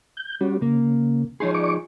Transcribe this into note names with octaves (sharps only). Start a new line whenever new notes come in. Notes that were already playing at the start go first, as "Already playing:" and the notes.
G6
G3 C#4 F#4
C#3 A#3
F3 D#4 G#4 C#5 C6
D5 C#6 D6